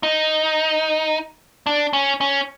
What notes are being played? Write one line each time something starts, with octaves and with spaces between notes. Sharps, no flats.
D#4
D4
C#4
C#4